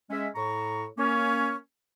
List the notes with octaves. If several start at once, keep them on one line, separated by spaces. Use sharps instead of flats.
G#3 C#4 E5
A2 A#5 C#6
A#3 C#4